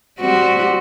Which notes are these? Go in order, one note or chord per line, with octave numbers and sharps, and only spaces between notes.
G3 C4 F#4